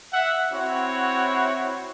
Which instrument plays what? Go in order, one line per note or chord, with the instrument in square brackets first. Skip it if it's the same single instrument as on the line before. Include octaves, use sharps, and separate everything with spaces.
[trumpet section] E5 F#5
C4 E4 F#4 C#5